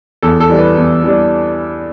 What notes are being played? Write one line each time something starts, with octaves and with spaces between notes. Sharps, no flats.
E2 A4
A4
E3 G3 D4
B4
E2
E3 G3 D4